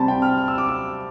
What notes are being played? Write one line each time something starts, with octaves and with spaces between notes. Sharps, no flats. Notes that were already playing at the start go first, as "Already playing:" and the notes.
Already playing: C3 G3 C4 A5 B5
G5
F6
F6
E6
D6
E6